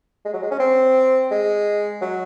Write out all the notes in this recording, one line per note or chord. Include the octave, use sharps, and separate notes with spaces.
G#3
F#3
G#3
C#4
C4
G#3
F#3